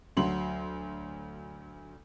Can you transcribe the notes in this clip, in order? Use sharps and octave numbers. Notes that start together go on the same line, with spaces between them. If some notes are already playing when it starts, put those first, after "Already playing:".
D2 F#3 C6 F#7